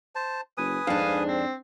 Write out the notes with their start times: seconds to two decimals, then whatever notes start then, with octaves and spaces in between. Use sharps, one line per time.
0.15 C5 A5
0.57 F#1 B4 G#5 D#6
0.87 F2 G#2 D4 F5
1.26 C4